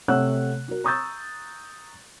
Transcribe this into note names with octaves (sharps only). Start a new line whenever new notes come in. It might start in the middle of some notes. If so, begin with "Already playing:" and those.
C3 A3 C#5 F#5 E6 F#6
F#4 A#4
A#5 C#6 D#6 E6 G6 A6